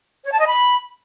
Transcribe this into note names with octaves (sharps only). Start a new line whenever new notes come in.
C#5
A5
D#5
B5